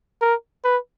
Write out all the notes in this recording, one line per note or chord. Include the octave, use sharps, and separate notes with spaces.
A#4
B4